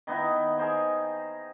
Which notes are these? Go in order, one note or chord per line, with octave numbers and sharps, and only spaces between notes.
D#3 B3 D#4 E4
G#4 A#4 C5 D#5